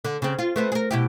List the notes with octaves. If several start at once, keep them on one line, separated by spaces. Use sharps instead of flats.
D3
C#3 C4
F4
A3 B3 C4
G#4 A#4
B2 E4 G4